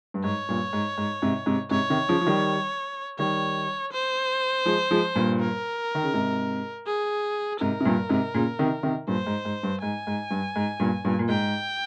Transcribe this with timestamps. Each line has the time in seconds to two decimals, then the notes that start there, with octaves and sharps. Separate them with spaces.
0.14 G2
0.24 G#2 C#5
0.49 G2 A#2
0.73 G#2
0.98 G#2
1.22 G#2 C3
1.46 G#2 C3
1.71 G#2 C3 C#5
1.90 C3 D#3
2.09 C#3 F3
2.21 F3
2.26 D#3 G3
3.19 D#3 G3 C#5
3.93 C5
4.66 F3 G#3
4.91 F3 G#3
5.15 G2 A#2
5.40 A#4
5.95 D#3
6.03 C#3
6.14 G#2 C3
6.87 G#4
7.60 G#2 C3 A#4
7.80 C3
7.85 G2 A#2
8.09 G#2 C3
8.34 A#2 C#3
8.59 C3 D#3
8.83 C3 D#3
9.08 G2 A#2 C5
9.27 G#2
9.45 G#2
9.63 G2
9.81 G#2 G#5
10.07 G#2
10.31 G2
10.56 G#2
10.80 G2 A#2
11.05 G2 A#2
11.19 A#2
11.29 G#2 G5